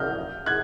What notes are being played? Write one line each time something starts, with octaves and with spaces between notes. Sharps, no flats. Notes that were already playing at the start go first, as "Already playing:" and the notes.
Already playing: F6 G6
F#6 G#6